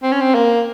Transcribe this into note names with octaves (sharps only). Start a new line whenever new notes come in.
C4
C#4
C4
A#3